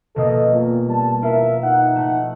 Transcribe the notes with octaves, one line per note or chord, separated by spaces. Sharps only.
D#1 B2 A#3 A4 D#5
A#2
G3 A5
E4 F4 A#4 E5
D#4 F#5
A3